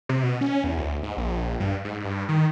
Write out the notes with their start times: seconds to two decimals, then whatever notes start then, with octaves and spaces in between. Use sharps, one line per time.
0.09 C3
0.23 B2
0.41 C#4
0.64 E2
0.77 D2
1.03 G#2
1.17 A#1
1.60 G2
1.84 G#2
2.04 G2
2.29 D#3